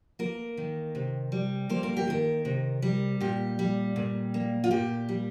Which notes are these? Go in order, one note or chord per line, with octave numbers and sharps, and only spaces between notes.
A#3 A#4
D#3
C3
G3
A#3 C5
A#4
G4
D#3 A#4
C3
G3
A#2 G4
G3
A#2
A#3
F4
A#2 G4
G3